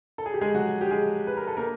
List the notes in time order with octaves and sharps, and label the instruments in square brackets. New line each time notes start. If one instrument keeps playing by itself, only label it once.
[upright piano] A4
G#4
G4
G#3 G#4
F#3 F#4
G4
G#3 G#4
B4
A#4
A4
A#3 A#4